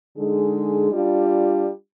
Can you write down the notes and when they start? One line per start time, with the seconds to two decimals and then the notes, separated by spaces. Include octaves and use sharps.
0.17 D3 G#3 D#4 G#4
0.93 G3 D4 F4